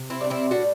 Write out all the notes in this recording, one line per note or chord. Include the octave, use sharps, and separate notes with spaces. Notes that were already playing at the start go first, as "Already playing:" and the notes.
Already playing: C3
C4 E4
G3 D4
C4 E4
A2 D4 F#4